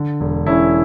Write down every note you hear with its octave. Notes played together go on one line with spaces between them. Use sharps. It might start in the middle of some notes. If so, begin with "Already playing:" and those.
Already playing: D3
E1
E1 C#4 E4